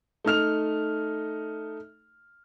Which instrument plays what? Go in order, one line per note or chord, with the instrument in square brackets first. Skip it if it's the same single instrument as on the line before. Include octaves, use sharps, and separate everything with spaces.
[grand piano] A3 D#4 F6 F7